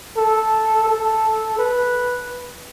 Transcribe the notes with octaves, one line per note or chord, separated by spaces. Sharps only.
A4
A4
B4